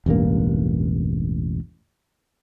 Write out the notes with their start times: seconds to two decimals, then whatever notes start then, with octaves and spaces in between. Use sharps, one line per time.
0.06 E1 A1 G2 A#3